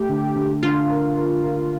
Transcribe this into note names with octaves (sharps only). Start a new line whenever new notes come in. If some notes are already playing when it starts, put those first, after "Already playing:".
Already playing: A3 G4
D3
D3
D3 F4
A#4
A#4
A#4